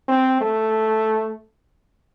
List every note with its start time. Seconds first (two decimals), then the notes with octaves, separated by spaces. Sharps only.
0.08 C4
0.41 A3